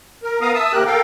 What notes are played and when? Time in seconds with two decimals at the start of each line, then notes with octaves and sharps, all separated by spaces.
0.23 A#4
0.41 B3 A#4 F5 A#5 D#6
0.54 E5 A5 D#6 E6
0.72 D#2 C3 G4 A#4 F#6
0.86 A4 A#4 F5 G5